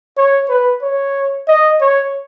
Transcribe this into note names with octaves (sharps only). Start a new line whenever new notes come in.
C#5
B4
C#5
D#5
C#5